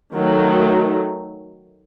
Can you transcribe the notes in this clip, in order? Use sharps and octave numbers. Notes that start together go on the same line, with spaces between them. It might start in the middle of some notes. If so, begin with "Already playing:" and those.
D#3 F#3 A3